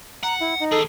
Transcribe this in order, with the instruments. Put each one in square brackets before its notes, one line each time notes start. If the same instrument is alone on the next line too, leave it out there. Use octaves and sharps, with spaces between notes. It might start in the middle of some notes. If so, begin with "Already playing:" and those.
[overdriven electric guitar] F#5 [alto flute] A#5
[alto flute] E4
D#4
[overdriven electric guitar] D#2 G#4 [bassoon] A4